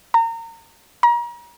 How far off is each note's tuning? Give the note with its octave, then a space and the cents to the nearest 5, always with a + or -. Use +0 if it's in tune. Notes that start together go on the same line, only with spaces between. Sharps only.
A#5 -30
A#5 +35